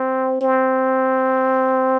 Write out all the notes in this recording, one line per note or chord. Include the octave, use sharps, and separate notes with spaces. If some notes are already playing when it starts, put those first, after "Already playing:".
Already playing: C4
C4